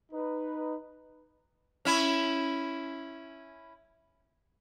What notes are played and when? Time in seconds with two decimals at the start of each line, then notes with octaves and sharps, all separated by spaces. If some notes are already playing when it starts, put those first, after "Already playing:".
0.12 D#4 B4
1.85 C#4 E4